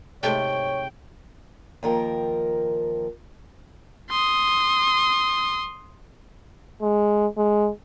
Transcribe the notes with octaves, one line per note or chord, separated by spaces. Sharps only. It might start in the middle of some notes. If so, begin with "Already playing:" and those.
G#2 C3 A3 C#5 G5
D#2 F3 A#4 G5
C6 D#6
G#3
G#3